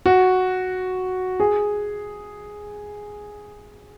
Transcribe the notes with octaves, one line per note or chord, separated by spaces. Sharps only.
F#4
G#4